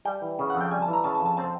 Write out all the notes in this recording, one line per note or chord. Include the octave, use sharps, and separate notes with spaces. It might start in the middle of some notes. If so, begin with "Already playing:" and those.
G3 G5
E3
C#3
F#5
F2
G5
G3 G#5
A5
E3
A#5
C#3 A5
A5
F2
A5
C4 A5